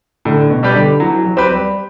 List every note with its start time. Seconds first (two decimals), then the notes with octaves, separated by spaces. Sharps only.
0.25 A2 D3
0.50 B2
0.63 G3 D4 G4 B4
0.75 D3
1.00 E3 F#3
1.25 F#3
1.37 C4 G4 B4
1.50 G3